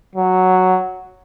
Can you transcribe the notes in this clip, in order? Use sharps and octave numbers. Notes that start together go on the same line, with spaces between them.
F#3